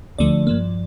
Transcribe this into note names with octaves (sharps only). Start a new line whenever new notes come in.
D2 D3 F3 A3 D5
G2 F3 A#3